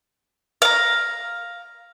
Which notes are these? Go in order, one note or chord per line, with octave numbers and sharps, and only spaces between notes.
F5 A#5